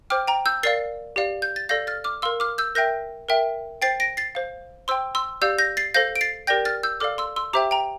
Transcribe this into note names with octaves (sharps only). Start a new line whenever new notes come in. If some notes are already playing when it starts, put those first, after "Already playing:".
C5 G5 D6 F6
G5 A#5
E6 G6
A#4 D5 F5 A6 C7
G4 D5 F5
G6
A6
A4 D5 F5 G6 A#6
F6 A6
D6 F6
A#4 F5 C6 E6
D6 F6
E6 G6
A#4 E5 G5 G6 A#6
A#4 E5 G5
C5 G5 A6 C7
A#6 D7
A6 C7
C5 F5
C5 G5 C6 E6
C6 E6
G4 D5 F5 E6 G6
G6 A#6
A6 C7
A4 C5 F5 G6 A#6
D7
A6 C7
G4 A#4 D5 G5 G6 A#6
F6 A6
E6 G6
A4 D5 F5 D6 F6
C6 E6
C6 E6
G4 C5 E5 G5 A#5 D6
G5 A#5